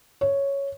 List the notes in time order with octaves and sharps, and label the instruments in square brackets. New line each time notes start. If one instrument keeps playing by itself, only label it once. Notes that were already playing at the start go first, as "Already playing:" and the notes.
[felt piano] C#5